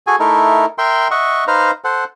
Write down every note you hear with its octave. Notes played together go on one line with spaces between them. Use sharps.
F#4 G#4 A4 G#5
A3 D#4 E4 A4 A#4
A#4 E5 G5 C6
D#5 E5 F#5 C#6
D#4 B4 C5 F5 A#5
A4 C5 F#5